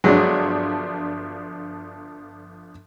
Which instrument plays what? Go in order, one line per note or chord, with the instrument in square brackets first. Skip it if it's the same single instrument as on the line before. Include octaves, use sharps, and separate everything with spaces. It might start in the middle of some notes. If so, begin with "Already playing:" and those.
[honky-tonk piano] G1 F3 D4 [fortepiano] F#3 G#3